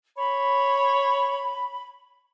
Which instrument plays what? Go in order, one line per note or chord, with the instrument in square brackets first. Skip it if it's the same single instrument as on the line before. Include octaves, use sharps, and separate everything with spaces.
[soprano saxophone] C#5 [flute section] B5